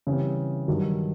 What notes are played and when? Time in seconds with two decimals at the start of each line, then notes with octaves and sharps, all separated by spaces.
0.07 C#3 E3 G3 C4
0.68 G2 D#3 F#3